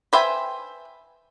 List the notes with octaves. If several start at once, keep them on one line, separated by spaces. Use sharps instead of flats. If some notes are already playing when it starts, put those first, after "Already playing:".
B4 C5 E5 G5 G#5